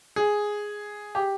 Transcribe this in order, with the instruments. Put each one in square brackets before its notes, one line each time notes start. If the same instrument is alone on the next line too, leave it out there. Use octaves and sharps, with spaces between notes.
[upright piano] G#4
G4